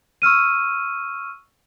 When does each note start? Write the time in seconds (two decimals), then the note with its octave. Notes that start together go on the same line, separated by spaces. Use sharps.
0.22 C#6 E6 F6 D#7